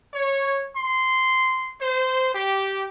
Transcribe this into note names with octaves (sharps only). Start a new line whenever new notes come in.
C#5
C6
C5
G4